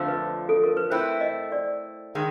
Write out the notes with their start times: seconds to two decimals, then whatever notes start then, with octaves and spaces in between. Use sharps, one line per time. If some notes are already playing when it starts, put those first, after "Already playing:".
Already playing: F2 D3 F3 A3 D4
0.08 B4
0.49 A4
0.64 A#4
0.77 B4
0.90 A3 C4 E4 C5
1.21 D#5
1.52 D5
2.15 D#3 G#3